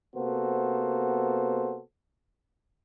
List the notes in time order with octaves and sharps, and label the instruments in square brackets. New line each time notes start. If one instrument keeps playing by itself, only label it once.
[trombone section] C3 A#3 B3 F#4 A4 C5